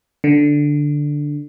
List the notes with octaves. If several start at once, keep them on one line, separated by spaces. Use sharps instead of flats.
D3